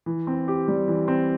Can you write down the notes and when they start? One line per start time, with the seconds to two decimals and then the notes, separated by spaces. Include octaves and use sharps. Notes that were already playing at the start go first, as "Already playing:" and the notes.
0.06 E3
0.27 C4
0.48 G4
0.68 G3
0.88 E3
1.08 C4